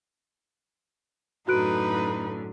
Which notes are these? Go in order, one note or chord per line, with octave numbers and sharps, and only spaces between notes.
F#2 A2 D3 D#4 F#4 B4 F#6 D7